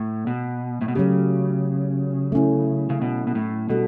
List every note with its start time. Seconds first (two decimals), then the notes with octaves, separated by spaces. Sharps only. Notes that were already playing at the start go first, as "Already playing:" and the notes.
Already playing: A2
0.27 B2
0.81 A2
0.88 B2
0.95 C#3 F#3 A3 C#4 G4
2.32 A3 C#4 E4
2.90 C#3
3.02 B2
3.27 B2
3.35 A2
3.69 B2 G3 D4 F#4 A4